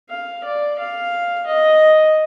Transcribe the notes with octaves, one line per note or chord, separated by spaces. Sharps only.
F5
D5
F5
D#5